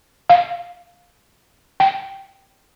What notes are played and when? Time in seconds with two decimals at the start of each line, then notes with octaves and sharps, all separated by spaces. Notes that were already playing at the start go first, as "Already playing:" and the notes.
0.30 F5
1.80 G5